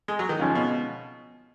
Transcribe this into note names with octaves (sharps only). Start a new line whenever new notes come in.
G#3
F#3
D#3
C#3 F3 G#3 C#4 F4
B2